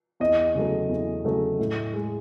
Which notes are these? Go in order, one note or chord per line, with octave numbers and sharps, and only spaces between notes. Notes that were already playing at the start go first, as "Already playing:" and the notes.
E2 D#5
C#3 F#3 A3
E2
C#3 F#3 A3
A2
G#3